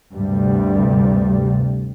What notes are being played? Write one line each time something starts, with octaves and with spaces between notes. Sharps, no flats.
D2 G2 C3 G3